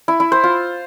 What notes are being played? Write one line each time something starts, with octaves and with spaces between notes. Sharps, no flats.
E4
E4
C5
F4